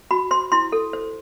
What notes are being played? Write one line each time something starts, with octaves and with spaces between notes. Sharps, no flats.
F#4 B5
C5 C6
E4 C6
A4
C5